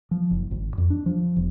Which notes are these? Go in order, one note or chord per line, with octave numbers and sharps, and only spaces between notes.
F3
F#1
G#1
F2
D4
F3
E1